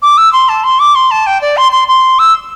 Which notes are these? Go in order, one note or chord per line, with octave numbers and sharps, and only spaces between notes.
D6
E6
C6
A5
C6
D6
C6
A5
G5
D5
C6
C6
C6
E6